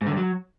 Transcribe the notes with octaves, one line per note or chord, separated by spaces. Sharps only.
G#2
D3
G2
F#3